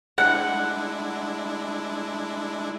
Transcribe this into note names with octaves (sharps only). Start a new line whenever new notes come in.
G#3 D4 E4 F#5